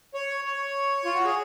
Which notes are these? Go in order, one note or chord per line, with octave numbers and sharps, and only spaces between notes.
C#5
C#5
F4
F#4
G#4